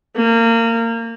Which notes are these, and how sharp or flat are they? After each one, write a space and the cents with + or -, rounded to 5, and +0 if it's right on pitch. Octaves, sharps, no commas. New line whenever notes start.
A#3 -25